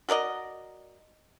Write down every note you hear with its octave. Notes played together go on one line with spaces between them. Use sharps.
F#4 A#4 D5 D#5